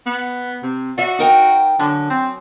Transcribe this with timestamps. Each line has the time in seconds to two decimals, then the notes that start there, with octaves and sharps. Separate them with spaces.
0.06 B3
0.63 C3
0.98 F#4 D5 E5
1.19 D#4 A#4 G5
1.79 F#2 D3
2.10 C4